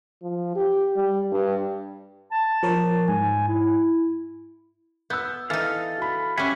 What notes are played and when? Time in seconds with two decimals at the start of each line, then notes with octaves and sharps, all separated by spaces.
0.22 F3
0.55 G4
0.96 G3
1.32 G2
2.31 A5
2.63 F3 A#4 C#5
3.08 G#2 G#5
3.47 E4
5.10 B3 E6 G6
5.50 E3 D#4 A4 F5
5.98 F#4 B5
6.37 G3 C#4 E5 F#5 G#5